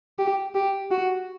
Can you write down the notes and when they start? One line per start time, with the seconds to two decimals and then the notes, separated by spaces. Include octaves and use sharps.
0.19 G4
0.55 G4
0.91 F#4